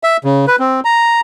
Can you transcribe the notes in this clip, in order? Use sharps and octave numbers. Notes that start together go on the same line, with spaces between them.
E5
C#3
B4
C4
A#5